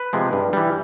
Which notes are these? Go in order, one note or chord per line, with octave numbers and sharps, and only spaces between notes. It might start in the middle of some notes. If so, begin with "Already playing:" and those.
Already playing: B4
C3 F3 G#3
G2
E3 G3